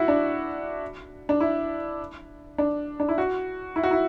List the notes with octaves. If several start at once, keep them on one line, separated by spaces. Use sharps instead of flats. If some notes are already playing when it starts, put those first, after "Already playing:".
Already playing: E4 F#4
D4
D4
E4
D4
D4
E4
F#4
E4
F#4
E4